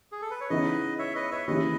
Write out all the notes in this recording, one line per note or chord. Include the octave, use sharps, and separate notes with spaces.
G#4
A4
B4
C#5
C#3 E3 B3 D#4 B4 D#5
C#5 E5
B4 D#5
C#5 E5
D#2 C#3 E3 B4 D#5